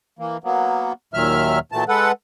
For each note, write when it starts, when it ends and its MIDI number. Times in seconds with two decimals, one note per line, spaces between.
0.19 0.37 52
0.19 0.37 58
0.44 0.93 54
0.44 0.93 58
0.44 0.93 59
1.14 1.59 39
1.14 1.59 46
1.14 1.59 51
1.14 1.59 54
1.14 1.59 76
1.14 1.59 89
1.72 1.84 46
1.72 1.84 52
1.72 1.84 54
1.72 1.84 57
1.72 1.84 81
1.89 2.12 56
1.89 2.12 69
1.89 2.12 71
1.89 2.12 78